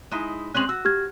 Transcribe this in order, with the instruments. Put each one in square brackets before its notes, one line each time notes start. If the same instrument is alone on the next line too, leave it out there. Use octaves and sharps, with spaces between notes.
[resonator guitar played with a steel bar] G#3 D#4 E4
[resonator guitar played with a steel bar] G#3 C4 C#4 [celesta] F#6 F#7
[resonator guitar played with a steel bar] F#4 [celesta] E6
[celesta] G4 F6 G#6